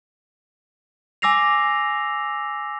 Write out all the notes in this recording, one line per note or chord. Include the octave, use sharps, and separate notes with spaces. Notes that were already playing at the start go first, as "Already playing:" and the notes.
G#5 D6 E6 A#6 C7 F7